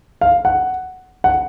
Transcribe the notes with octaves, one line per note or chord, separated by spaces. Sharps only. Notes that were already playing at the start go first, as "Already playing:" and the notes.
F5
F#5
F#5